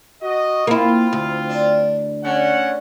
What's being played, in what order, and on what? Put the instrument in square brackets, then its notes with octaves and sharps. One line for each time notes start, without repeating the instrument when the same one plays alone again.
[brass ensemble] F#4 D#5
[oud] A#3 E4 [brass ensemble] C4 F4
[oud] D2
[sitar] D4
[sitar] D3 [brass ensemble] C#4 F#5